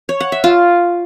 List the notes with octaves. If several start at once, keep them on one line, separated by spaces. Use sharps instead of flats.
C#5
F#5
E5
F4